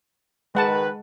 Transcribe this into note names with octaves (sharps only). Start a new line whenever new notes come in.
D#3 G#3 B4 F#5 A5